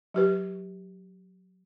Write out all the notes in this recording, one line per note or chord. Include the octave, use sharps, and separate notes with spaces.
F#3 G4 B4